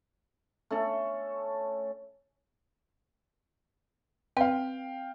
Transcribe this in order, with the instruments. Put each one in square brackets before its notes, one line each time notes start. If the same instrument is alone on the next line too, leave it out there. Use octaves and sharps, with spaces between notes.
[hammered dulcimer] A3 C#4 A4
[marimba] C4 B4 [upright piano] F5 G5